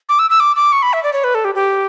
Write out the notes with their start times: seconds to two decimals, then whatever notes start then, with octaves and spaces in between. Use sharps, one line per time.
0.09 D6
0.19 E6
0.30 E6
0.40 D6
0.56 D6
0.72 C#6
0.82 B5
0.93 E5
1.03 D5
1.13 C#5
1.24 B4
1.35 A4
1.44 G4
1.55 G4